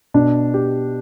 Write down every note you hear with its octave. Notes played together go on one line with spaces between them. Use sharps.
B2 D4
G4